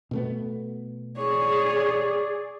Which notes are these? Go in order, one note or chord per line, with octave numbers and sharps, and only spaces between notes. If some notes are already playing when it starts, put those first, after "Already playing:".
B2 A3 B3
G#4 C#5 D5